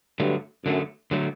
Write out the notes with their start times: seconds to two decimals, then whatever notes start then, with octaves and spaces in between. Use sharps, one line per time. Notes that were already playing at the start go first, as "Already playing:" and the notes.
0.20 G2 D3 F#3 A3
0.65 F#2 D3 F#3 A3
1.11 D3 F#3 A3